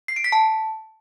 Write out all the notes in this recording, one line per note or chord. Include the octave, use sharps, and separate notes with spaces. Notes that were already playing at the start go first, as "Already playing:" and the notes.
C7
D7
B6
A5